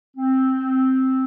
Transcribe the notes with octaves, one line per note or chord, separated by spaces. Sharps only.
C4